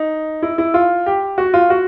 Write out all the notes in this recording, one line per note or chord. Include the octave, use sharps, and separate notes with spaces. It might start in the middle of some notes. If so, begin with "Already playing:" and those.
Already playing: D#4
E4
E4
F4
G4
F#4
F4
F#4